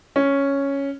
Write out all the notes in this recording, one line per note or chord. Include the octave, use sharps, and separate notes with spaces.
C#4